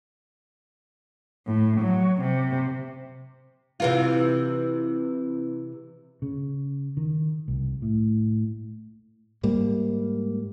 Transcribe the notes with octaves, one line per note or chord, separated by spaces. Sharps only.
A2
F#3
C3
C3 E3 F4
C#3
D#3
C2
A2
G#2 G3 A#3